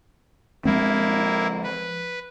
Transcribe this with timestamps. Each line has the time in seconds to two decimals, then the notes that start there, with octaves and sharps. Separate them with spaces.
0.65 F3 G#3 A#3 C4 E4
1.64 B4